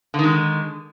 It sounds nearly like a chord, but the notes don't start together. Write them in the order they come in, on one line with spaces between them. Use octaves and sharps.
D3 D#3 G#3